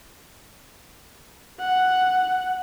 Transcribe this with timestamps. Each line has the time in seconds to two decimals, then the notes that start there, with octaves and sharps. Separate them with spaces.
1.60 F#5